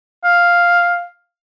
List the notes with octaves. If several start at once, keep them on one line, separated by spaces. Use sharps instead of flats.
F5